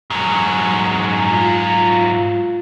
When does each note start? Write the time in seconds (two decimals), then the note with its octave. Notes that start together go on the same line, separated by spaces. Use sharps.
0.10 G#2 F#3
1.31 F4